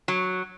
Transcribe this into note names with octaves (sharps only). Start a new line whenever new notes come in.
F#3